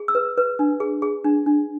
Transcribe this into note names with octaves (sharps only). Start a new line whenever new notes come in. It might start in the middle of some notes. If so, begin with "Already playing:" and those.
Already playing: G#4
E6
B4
B4
D4
G#4
G#4
D4
D4